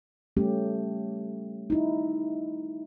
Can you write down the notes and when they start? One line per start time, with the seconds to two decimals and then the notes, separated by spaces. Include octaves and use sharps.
0.37 G3 A3 C#4 G4
1.70 D#4 E4